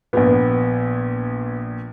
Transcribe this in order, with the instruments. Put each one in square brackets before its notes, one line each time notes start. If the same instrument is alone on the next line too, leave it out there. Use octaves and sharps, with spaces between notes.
[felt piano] A#1 A#2 [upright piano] B3